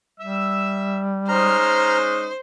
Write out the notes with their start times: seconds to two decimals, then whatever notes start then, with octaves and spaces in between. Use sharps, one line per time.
0.20 G3 E5 E6
1.29 G#3 C#4 D#4 C5 A#5 F6